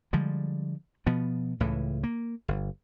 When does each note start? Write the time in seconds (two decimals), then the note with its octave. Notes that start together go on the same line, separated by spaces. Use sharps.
0.13 D3 F3 G3 G#3
1.07 B2 F3 B3
1.60 C#2 A2 C#3 E3
2.04 A#3
2.48 G1